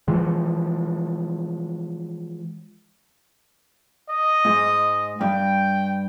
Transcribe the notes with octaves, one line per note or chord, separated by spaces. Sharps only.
E3 F3 G#3
D#5
G#2
G2 G5